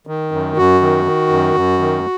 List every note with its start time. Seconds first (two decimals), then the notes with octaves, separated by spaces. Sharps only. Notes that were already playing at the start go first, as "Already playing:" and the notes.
0.07 D#3
0.32 F#2
0.57 F#2 F#4
0.81 D#3
1.05 D#3
1.30 F#2
1.55 F#2
1.79 D#3